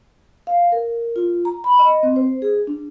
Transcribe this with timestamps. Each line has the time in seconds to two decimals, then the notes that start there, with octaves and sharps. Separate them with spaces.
0.47 F5
0.72 A#4
1.16 F4
1.45 A#5
1.64 B5
1.79 D#5
2.03 C4
2.16 C5
2.42 G#4
2.67 D4